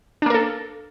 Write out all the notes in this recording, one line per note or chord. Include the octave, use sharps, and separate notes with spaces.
A#3 D4 A4 A#4